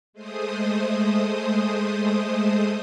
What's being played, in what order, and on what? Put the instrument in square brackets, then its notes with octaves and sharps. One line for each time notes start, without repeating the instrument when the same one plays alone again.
[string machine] G#3 A3 C5 D#6